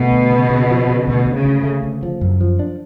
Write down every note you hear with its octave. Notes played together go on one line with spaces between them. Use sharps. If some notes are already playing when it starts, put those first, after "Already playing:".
Already playing: B2 A3
D2
C#3
C#3
F3
C#3
D2 B2
D2
C#3
D2
A3
D2
F3
F#2
F3
D4